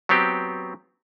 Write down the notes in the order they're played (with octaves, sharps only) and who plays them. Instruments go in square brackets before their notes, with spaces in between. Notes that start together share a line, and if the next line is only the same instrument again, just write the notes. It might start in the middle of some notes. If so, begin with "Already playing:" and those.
[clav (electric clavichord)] F#3 B3 C4 G4